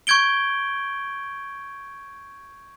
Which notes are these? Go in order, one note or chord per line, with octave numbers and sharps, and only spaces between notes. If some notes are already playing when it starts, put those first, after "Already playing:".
C#6 G6 G#6 D7 G7